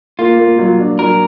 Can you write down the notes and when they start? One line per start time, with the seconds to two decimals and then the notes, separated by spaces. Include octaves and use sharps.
0.19 A#3 F4
0.39 A#3
0.58 F#3
0.79 D4
0.99 F#3 A#4